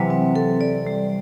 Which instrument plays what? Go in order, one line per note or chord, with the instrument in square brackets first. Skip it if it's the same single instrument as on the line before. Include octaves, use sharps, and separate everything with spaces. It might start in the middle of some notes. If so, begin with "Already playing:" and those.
Already playing: [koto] C3 E3 [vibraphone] F#3
[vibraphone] C4
A4
D5
G3